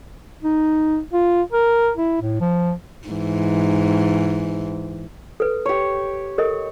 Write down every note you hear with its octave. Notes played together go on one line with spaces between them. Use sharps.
D#4
F4
A#4
E4
A2
F3
G#2 E3
A4 B4
G4 C#5
A4 A#4 D#5